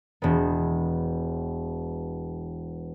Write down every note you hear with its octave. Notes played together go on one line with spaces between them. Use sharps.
E1 B3